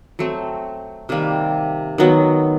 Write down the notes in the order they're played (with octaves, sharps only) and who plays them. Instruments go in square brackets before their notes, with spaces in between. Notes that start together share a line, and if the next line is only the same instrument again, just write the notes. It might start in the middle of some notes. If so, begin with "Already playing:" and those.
[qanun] F#3 A3 C4
C3 D#3 G3 A#3
D#3 F#3 B3